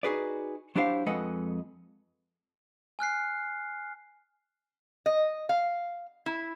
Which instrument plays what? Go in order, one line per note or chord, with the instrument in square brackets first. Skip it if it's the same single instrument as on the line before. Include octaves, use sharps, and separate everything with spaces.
[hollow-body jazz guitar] D#4 F#4 G#4 B4 D5
F#3 D4 E4 G4 C5 F5
F2 G#3 A4 B4 D#5 F#5
[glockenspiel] G#5 F6 F#6 C7
[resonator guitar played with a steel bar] D#5
F5
E4